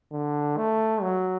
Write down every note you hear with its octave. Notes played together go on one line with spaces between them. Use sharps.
D3
A3
F#3